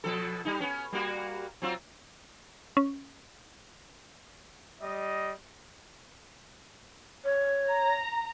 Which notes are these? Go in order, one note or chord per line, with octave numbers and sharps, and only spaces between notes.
B2 F3 A4
G3 D#4
B3 C#4
G3 A#3 F#4
F#3 C4 F4
C#4
G3 D#5
C#5
A#5